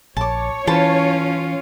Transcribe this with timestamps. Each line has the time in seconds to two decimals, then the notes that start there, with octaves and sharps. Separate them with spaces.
0.17 A#1 C#5 A5 D6
0.67 E3 C#4 F4 C5 A5 B5